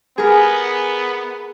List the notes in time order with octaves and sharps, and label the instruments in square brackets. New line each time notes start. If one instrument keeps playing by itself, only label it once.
[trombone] B3 [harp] G#4 A#4